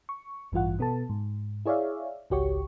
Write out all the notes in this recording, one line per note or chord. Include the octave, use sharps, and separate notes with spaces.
C#6
A1 G2 E3 F4 F#5
B2 B3 A4 A5
G#2
E4 G#4 C#5 D5 E5 F5
G#1 C#2 F#4 G4 C#5 C#6